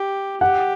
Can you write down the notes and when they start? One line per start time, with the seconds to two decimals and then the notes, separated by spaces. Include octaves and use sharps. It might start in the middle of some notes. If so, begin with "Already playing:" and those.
Already playing: G4
0.41 G4 F#5